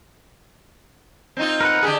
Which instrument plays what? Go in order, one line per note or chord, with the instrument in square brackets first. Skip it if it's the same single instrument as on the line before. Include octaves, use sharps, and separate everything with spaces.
[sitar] C4 D#4 F4
[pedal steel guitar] A#4 B4 F#5
[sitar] D3 G4 G#4